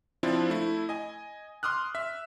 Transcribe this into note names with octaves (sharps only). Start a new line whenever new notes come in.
F3 C4 D4 E4 F4
A3 E4
D#5 G#5
C6 D6 D#6 F6 F#6
E5 E6